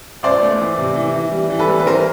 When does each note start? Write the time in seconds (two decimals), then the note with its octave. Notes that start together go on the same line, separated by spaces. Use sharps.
0.23 C#2 C5 D5
0.42 A3
0.59 E3
0.78 C3
0.95 E3
1.14 E3
1.32 G3
1.50 E3
1.59 A4 B4
1.68 G3
1.80 B4
1.86 E3 A#4 C5